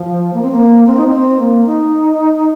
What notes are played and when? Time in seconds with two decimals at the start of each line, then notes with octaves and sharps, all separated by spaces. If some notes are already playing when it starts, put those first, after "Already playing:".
Already playing: F3
0.34 A#3
0.42 C4
0.51 A#3
0.87 C4
0.97 D#4
1.07 C4
1.39 A#3
1.66 D#4